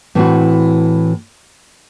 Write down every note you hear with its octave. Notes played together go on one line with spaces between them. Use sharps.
A2 E3 C4 F#4